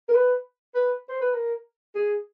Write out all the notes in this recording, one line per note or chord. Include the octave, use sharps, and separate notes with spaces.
A#4
B4
B4
C5
B4
A#4
G#4